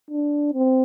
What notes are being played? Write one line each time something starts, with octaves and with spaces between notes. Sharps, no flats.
D4
C4